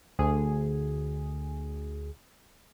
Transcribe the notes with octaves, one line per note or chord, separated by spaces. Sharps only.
D2 G#4